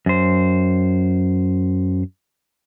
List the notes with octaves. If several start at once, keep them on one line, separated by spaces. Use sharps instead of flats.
F#2 C5